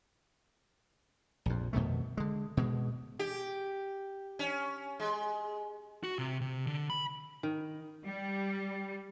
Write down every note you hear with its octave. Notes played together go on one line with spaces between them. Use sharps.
A#1 F2
F2 B2 D#3 A3
D3 G#3
B2 G#3
G4
C#4
G#3
F#4
C3
C3
D3
B5
D#3
G3